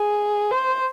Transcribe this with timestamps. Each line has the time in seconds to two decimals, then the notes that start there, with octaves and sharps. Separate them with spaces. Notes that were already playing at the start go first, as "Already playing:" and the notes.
Already playing: G#4
0.51 C5